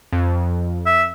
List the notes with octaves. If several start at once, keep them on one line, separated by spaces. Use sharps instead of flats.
F2
E5